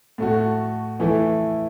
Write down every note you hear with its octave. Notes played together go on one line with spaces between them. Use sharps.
A2 A3 F#4
E3 A3 E4